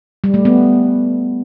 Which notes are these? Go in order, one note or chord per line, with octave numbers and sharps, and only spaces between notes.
G3
A3
B3